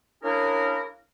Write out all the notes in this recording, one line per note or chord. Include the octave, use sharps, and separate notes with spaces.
A#3 C#4 D4 E4 G#4 A#4